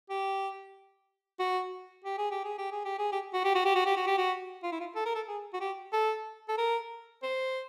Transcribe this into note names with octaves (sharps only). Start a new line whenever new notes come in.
G4
F#4
G4
G#4
G4
G#4
G4
G#4
G4
G#4
G4
F#4
G4
F#4
G4
F#4
G4
F#4
G4
F#4
F4
E4
F4
A4
A#4
A4
G#4
F#4
G4
A4
A4
A#4
C5